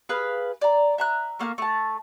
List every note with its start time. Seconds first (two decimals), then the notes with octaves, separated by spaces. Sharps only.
0.09 G#4 B4 F5
0.61 D5 A#5
0.98 E5 A#5 F#6
1.39 A3 A#3 F5 F6
1.58 A3 A5